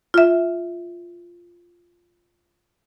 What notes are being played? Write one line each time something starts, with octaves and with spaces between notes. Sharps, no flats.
F4 E5